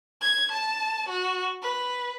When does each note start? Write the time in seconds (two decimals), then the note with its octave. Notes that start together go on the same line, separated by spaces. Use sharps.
0.22 G#6
0.52 A5
1.09 F#4
1.62 B4